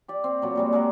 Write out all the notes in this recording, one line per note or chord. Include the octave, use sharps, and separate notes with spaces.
G4 D5
C4
A#2 F#3
A#2 G3 G#3
G#3 A#4 F#5